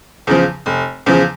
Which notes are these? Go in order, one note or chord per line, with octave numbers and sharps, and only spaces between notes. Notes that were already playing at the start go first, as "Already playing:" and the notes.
E2 C#3 F3
F1
E2 C#3 F3